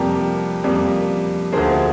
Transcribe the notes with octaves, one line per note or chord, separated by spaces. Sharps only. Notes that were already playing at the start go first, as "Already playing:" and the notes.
Already playing: F2 C3 G3 A#3 G4 A#4
F2 C3 G3 A#3
D2 D3 F3 A#3 G#4 C5